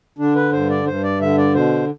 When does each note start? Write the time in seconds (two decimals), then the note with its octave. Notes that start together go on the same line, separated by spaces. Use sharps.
0.18 D3 D4
0.35 B4
0.52 G2 C5
0.69 D5
0.86 G2 C5
1.03 D5
1.20 D3 E5
1.37 D5
1.54 B2 C5